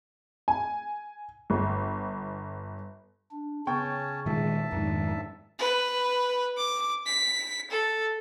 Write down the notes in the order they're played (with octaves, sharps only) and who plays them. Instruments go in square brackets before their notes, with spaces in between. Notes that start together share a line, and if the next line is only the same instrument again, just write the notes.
[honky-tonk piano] G#5
G1
[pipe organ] D4
[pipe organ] C#3 [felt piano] B3 G5 C#6 [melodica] C#4 C#5 A5
[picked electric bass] A#2 D#3 G#3 [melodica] E5 A5
[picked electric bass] F2 G#2 [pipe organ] D#3 D#4
[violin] B4
D6
B6
A4